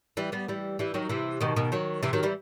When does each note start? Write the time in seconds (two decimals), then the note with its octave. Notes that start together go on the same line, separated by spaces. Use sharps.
0.17 E3 G3
0.32 G3 B3
0.48 E3 G3
0.79 E3 G3
0.94 D#3 F#3
1.09 C3 E3
1.41 B2 D#3
1.56 B2 D#3
1.72 D#3 F#3
2.03 C3 E3
2.13 D#3 F#3
2.23 E3 G3